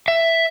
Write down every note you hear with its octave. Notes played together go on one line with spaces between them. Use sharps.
E5